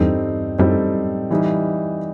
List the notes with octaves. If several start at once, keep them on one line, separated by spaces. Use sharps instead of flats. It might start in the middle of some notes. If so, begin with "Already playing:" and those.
Already playing: E2 G2 G3 C4 D#4 A4
F#2 A2 G3 C4 D#4 A4
E3 G3 D#4